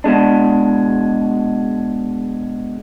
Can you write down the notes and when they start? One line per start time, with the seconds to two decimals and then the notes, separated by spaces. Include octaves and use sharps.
0.04 B2 G#3 D4